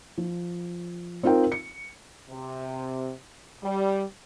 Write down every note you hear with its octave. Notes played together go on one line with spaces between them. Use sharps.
F3
C4 D#4 F4 A#4 G5
C#7
C3
G3